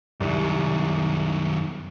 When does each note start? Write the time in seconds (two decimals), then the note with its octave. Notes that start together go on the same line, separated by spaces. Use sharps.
0.20 C2 F#2 D#3